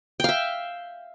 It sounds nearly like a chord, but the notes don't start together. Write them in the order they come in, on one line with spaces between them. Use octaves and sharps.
G5 F5 E5